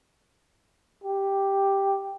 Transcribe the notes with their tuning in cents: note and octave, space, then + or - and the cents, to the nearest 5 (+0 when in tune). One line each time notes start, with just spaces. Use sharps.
G4 +0